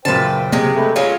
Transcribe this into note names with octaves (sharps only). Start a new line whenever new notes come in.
F#2 A#2 C#3 B4 C5 G5 A5
C3 G#3 A#3
A3 A4 B4
F#3 G#3 C#4 F4 F5